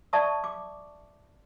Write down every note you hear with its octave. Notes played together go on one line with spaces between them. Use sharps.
D5 E5 A5 C#6 D#6
D6